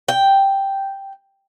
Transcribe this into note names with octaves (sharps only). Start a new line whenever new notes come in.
G5